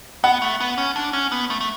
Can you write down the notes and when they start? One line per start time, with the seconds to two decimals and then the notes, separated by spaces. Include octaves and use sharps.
0.24 B3 F#5
0.42 A3
0.60 B3
0.78 C#4
0.96 D4
1.13 C#4
1.32 B3
1.50 A3
1.61 A3